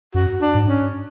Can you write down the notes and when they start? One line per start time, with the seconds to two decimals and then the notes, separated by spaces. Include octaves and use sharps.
0.14 F#2 F#4
0.41 D4
0.54 G#2
0.68 C#4